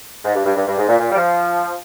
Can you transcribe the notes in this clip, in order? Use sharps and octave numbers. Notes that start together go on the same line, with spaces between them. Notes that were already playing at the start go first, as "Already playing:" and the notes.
G#2
G2
G2
G2
G2
G#2
A#2
A#2
G3
F3